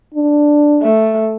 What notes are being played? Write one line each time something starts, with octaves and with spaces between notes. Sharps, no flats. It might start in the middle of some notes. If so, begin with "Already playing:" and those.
D4
A3